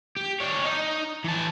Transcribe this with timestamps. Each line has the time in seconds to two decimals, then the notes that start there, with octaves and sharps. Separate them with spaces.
0.16 G4
0.40 D4 C#5
0.65 D#4
1.24 E3 A5